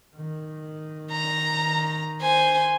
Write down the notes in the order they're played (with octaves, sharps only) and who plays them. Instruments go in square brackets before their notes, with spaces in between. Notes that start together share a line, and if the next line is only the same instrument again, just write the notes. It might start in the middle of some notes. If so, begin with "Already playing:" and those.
[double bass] D#3
[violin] A#5
C5 G#5